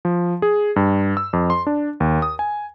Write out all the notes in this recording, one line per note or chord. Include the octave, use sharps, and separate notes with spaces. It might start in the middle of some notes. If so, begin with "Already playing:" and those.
F3
G#4
G2
E6
F2
C6
D4
D#2
D#6
G#5